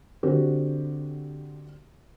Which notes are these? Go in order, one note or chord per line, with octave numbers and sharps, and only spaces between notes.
D3 C4 F#4 G4